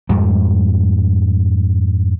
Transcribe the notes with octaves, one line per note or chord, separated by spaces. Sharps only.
F2 G#2 G3